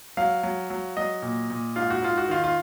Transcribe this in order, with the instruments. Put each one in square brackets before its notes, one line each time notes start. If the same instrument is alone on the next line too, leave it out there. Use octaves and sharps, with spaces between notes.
[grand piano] F#3 F5
F#3
F#3
F#3 D#5
A#2
A#2
G#2 F4
F#4
G#2 F4
F#4
D#3 F4
F4